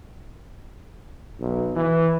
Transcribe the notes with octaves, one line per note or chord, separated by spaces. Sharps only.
B1
E3